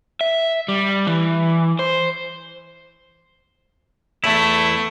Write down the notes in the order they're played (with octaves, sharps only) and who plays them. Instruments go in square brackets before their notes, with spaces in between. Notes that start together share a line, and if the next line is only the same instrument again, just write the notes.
[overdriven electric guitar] E5
G3
E3
C5
[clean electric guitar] E2 E4 [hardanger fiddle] A3